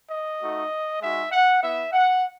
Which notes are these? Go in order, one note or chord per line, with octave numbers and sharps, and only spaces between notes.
D#5
A3 D#4 F#4
G#3 D#4 F#4 E5
F#5
B3 E4 E5
F#5